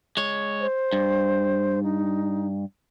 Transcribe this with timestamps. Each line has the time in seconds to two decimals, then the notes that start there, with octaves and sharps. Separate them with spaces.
0.17 G#3 C#5
0.60 C5
0.93 G2
1.83 D#4